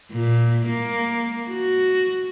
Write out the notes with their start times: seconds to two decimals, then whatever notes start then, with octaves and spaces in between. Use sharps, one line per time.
0.12 A#2
0.67 A#3
1.49 F#4